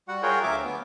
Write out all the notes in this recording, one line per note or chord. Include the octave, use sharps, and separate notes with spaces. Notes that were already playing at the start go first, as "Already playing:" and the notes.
G3 F#4 F#5
F4 F#4 G#4 A#4 C#5 G5
D2 F#3 E5 D6
B3